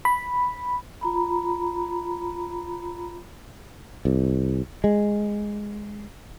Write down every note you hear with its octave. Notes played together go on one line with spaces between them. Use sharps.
B5
F4 A#5 B5
C2
G#3